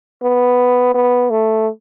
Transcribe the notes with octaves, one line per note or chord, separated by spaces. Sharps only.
B3
B3
A3